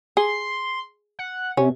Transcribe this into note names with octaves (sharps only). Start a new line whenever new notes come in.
G#4 C6
F#5
C3 C#4